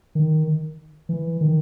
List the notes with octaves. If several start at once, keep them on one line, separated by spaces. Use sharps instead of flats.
D#3
E3
D#3